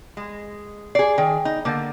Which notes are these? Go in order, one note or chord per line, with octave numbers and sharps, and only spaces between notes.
G#3
G#4 D5 C7
D#3 G#4 G5 G#5
D#4
D3 A#3 D6 G6 A6